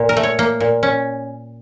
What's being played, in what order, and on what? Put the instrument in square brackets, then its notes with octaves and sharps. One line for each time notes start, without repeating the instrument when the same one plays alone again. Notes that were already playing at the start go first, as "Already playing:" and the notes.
Already playing: [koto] A#2
A#4
A3
C#5
A#3
A#2
C#4